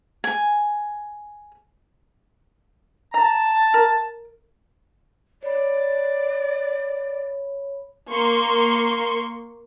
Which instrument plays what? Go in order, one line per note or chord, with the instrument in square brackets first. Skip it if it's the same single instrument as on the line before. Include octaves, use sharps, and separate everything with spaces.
[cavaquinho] G#5
[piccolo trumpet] A5 [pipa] A#5
[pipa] A#4
[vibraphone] C#5 B5 [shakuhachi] D5
[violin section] A#3 C6 C#6